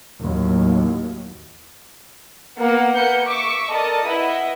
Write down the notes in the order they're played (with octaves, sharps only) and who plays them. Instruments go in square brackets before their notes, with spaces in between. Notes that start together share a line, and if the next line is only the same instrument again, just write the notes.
[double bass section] D#2 A2 F#3
[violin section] A#3 B3 F#5
A#3 B4 F#5 G6 C#7
E5 C#6 D6
A4 A#4 D5 D#5 A5 D#6
E4 B4 D#5 E5 F#5